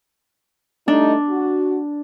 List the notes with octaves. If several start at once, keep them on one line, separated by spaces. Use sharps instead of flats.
G3 A3 D4 D#4
F#4